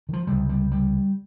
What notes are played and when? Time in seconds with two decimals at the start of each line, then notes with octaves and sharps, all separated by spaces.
0.09 D#3
0.13 F3
0.27 C#2 C3 G3
0.49 G3
0.72 G3